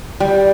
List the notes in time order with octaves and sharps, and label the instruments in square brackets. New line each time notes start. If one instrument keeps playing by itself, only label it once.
[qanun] G3